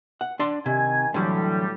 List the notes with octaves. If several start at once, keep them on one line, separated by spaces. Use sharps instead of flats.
F#5
D4 D5 C6
C3 D#3 G#5
A2 D3 E3 F#3 G3